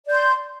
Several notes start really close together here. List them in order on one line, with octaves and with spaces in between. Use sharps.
D5 G6 C6